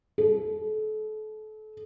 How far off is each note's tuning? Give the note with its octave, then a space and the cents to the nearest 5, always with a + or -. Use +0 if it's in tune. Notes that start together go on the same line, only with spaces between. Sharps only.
A4 -35